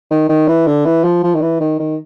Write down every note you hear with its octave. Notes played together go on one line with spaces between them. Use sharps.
D#3
D#3
E3
D3
E3
F3
F3
D#3
E3
D#3
D#3